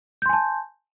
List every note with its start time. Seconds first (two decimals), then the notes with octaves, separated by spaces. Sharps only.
0.22 G6
0.26 C6
0.29 G#5
0.33 A5